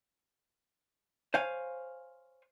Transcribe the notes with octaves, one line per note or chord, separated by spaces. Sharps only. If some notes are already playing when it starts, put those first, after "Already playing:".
C5 C#5 F5 G#5